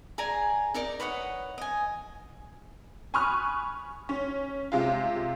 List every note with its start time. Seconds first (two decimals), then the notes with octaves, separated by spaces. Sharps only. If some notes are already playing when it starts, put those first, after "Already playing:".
0.18 G#4 D5 G#5 A#5
0.74 D#4 A#4 D5 A#5
1.00 B4 C#5 D#5 F#5
1.58 D#5 G#5
3.14 G#5 B5 C#6 D#6 F6 F#6
4.09 C#4
4.72 C3 G#3 F4